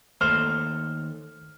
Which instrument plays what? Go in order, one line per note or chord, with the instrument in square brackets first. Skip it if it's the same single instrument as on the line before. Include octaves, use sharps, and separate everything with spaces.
[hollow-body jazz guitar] D#2 A3 C5 [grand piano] F6